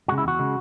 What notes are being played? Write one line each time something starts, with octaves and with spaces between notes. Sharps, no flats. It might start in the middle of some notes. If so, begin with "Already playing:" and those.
C#3 G#3 F#4
E4
E2 F#4
C#3 G#3